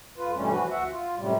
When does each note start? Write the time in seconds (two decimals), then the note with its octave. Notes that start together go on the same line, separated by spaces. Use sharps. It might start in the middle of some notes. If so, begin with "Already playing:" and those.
0.18 F2 F4 B4
0.35 G2 B2 E3 G3 A3 C#4
0.50 E3 F3 F#4 B4
0.71 D2 F#4 E5 F#5
0.91 F4
1.16 F#2 A2 C3 G3